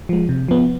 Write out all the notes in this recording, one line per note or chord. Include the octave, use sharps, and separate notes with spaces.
F3 G#3
C3
F3 B3